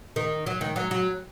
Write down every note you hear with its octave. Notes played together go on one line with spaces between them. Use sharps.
D#3
F#3
D#3
F#3
F#3